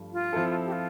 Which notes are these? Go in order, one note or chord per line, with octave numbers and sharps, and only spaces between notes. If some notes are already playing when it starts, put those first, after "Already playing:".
Already playing: G2 F3 A3
F4
F3 C4 E4 A4
G4
F4